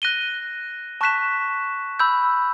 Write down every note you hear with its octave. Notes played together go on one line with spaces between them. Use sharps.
F#6 A#6 D#7 G7
A5 C#6 F#6 B6 E7
B5 E6 G6